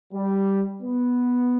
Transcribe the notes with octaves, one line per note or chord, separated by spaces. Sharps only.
G3
B3